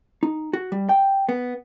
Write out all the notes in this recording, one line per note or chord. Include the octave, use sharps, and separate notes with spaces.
D#4
F#4
G3
G5
B3